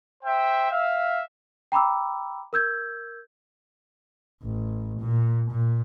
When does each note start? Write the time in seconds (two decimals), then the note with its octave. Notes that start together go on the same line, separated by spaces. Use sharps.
0.23 C5 E5 G5
0.69 E5 F5
1.72 G5 A#5 B5 D6 E6
2.53 A#4 E6 G6 G#6
4.44 A1
5.00 A#2
5.51 A#2